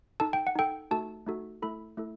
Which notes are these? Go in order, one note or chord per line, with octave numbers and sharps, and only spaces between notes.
D#4 A4 A5
G5
F#5
D#4 A4 G5
A3 D#4 F#4 A4 A5
A3 D#4 F#4 A4
A3 E4 A4 B5
A3 E4 A4